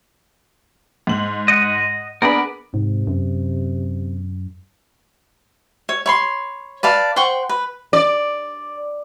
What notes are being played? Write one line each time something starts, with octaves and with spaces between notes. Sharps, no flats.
G#2 F#7
D#5 F#5
B3 D4 G#4 A#4 D5 B5
G#2 C3
F#2
C#5
C#5 B5 C6
B4 D5 F5 A5
C5 F#5 G5 C#6
B4
D5